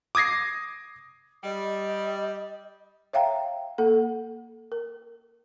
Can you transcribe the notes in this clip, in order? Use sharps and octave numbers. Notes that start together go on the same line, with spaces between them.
D6 D#6 G#6 A#6 C7
G3 D#5
C#5 E5 F5 G5 A#5
A#3 A4 F#5
A#4